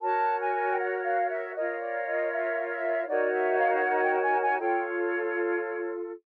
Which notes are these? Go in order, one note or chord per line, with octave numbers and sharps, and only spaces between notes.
F#4 A#4 C#5 A5
G#5
G5
F#5
F5
E5
F4 A#4 C#5 D#5
D5
D#5
E5
E5
D#4 F#4 A#4 C#5 D5
E5
F5
F#5
G5
G#5
G#5
F4 A4 C#5 G5